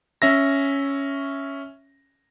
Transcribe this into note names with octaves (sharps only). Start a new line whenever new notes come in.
C#4 E5 A#6